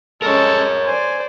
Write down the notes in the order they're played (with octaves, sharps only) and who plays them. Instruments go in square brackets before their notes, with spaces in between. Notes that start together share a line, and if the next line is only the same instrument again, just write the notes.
[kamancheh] G#3 C#4 [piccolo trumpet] A4 [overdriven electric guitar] A#4 C#5
[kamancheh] C5 D5 [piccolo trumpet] G#5